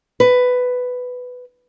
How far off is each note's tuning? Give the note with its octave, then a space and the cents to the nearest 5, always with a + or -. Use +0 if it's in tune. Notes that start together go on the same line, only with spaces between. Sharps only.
B4 +10